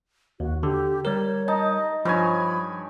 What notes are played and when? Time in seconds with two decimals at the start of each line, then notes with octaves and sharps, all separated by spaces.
0.40 D#2 F#4
0.63 D3 G4
1.05 G3 A#4 C#5
1.48 D#4 D#5 A5
2.05 G2 F3 C#5 G#5 B5